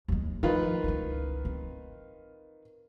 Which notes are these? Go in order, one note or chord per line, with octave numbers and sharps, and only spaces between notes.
D#2 G#3
D#3 F3 F4 B4
C#2 E4
C4